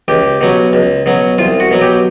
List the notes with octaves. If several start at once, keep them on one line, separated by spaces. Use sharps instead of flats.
C#2 G4
B2 F#3
C#2
B2 F#3
C2 F4
F#4
B2 F#3
G4